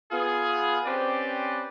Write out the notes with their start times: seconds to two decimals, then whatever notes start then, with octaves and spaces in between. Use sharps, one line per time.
0.12 B3 F4 G#4
0.86 C4 C#4 G4 B4 C5 D5